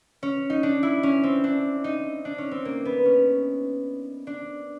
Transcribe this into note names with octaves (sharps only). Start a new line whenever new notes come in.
C#4
D#4
D4
E4
C#4
C4
D4
D#4
D4
C#4
C4
A#3
B3
C#4
D4